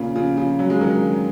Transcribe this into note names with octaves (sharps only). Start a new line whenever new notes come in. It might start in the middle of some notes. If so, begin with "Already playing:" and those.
Already playing: A#2 C#3
C#3 F3
C#3 F3
F#3
G#3
D#3 F#3